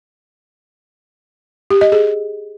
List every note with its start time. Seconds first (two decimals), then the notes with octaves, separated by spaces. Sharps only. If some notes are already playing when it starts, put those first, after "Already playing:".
1.70 G4
1.81 D#5
1.92 G#4